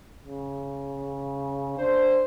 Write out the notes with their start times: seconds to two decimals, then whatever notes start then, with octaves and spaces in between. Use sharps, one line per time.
0.25 C#3
1.78 D4 C5